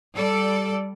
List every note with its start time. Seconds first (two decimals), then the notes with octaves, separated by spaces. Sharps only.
0.15 G3 A4 D5